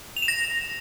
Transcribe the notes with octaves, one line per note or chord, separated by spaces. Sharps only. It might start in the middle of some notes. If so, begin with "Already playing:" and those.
F7
E7
A#6